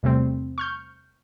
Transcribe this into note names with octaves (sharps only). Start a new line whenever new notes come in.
E2 C3 G3 A3 C4
C#6 F6 G6